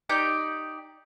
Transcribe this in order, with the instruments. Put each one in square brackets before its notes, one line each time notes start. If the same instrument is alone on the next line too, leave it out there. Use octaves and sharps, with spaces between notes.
[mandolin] D#4 G4 D5 G6